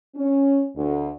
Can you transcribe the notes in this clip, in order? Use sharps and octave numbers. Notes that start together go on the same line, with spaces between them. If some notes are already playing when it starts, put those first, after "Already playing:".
C#4
D2